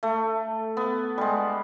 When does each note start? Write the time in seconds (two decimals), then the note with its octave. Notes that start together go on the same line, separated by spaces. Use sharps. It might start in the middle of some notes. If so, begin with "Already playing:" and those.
0.03 A3
0.77 B3
1.18 G3 G#3